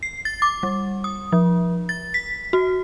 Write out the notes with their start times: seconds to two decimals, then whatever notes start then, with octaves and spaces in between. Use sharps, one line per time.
0.03 C7
0.25 A6
0.42 D6
0.63 G3
1.04 D#6
1.32 F3
1.89 A6
2.14 B6
2.53 F#4